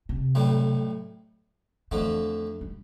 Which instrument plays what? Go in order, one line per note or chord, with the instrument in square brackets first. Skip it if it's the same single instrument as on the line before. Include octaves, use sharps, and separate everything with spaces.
[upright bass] C3
[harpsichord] B1 A2 G3
[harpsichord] F2 D3 A3 [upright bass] E3
[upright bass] G3